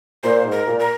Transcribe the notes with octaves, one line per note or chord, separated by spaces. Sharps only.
A#2 C5
G#2
A#4
A#2
A#4